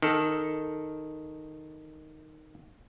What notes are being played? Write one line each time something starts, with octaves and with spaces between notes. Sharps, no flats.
D#3 A4